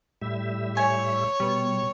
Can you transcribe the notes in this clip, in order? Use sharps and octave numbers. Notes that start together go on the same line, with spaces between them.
A2 G3 E5
C#5 G#5
B2 G3 B3